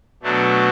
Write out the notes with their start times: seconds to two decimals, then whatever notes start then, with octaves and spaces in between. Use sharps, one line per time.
0.23 B2 F#3 A3 D4